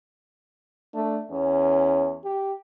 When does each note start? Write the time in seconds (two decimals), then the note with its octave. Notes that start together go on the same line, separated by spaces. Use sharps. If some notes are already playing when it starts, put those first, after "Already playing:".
0.94 A3 D4
1.31 E2 C#4
2.24 G4